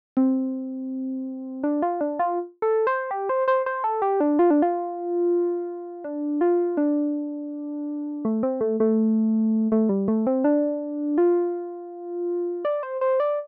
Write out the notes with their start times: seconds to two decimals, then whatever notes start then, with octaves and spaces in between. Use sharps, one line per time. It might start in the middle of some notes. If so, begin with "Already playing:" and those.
0.17 C4
1.64 D4
1.82 F4
2.01 D4
2.19 F4
2.62 A4
2.87 C5
3.11 G4
3.29 C5
3.48 C5
3.66 C5
3.84 A4
4.02 G4
4.20 D4
4.39 F4
4.50 D4
4.62 F4
6.04 D4
6.41 F4
6.77 D4
8.25 A3
8.43 C4
8.61 A3
8.80 A3
9.72 A3
9.89 G3
10.08 A3
10.27 C4
10.44 D4
11.18 F4
12.65 D5
12.83 C5
13.01 C5
13.20 D5